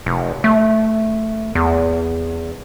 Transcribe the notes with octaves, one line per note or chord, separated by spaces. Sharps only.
F1
A3
E2